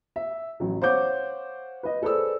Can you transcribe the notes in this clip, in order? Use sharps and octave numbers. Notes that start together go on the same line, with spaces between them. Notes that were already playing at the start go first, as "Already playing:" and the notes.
E5
A1 F#3
C5 C#5 F5 F#5 D6 G6
B4 D#5
G#4 A4 B4 C5 D5 E6